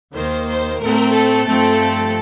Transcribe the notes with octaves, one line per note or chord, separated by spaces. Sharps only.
D#2 D#3 A#3 C5
C5
A2 A3 C4 A#4
A4
G2 F3 A3 C4